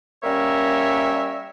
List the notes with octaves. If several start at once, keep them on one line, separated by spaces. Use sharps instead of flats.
G3 A#3 C#4 A#4 C#5 E5